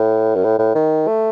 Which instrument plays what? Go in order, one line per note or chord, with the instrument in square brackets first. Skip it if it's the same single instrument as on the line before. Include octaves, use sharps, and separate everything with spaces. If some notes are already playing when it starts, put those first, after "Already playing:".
Already playing: [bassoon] A2
F#2
A2
A2
D#3
A3